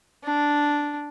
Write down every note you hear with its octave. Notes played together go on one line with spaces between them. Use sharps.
D4